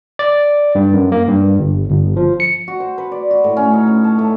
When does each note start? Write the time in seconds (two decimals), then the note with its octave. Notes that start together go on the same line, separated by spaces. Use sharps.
0.19 D5
0.75 G2
0.94 F#2
1.12 A#3
1.28 G2
1.59 G1
1.90 G1
2.16 F3
2.40 C#7
2.68 F#4
2.80 C5
2.98 B4
3.12 D5
3.31 F#4
3.44 A2
3.57 C#4
3.74 D#4
3.87 C#4
4.04 A5
4.19 A3